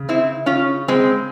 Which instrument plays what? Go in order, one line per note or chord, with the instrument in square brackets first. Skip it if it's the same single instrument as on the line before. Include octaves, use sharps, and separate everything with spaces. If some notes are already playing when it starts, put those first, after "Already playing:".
Already playing: [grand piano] C#3
[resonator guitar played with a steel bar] C4 E4
C#4 F4
G#3 C4